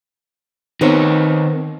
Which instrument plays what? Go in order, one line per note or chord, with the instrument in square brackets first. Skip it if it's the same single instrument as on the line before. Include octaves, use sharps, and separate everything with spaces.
[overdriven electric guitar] D#3 C#5 [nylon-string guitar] B3 C4 A#4